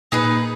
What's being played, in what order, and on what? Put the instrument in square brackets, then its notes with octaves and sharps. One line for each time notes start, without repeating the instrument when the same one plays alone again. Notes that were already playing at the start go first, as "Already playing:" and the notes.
[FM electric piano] A#2 [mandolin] D#4 G#4 B4